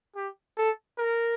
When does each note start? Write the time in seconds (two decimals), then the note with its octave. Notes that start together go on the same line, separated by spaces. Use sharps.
0.16 G4
0.57 A4
0.98 A#4